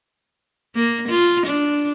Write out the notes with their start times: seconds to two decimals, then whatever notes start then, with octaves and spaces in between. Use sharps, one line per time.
0.75 A#3
1.09 F4
1.47 D4